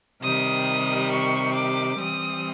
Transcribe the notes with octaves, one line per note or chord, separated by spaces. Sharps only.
C3 D#3 G3 D#6
C#6
D6
E3 G3 C4 D#6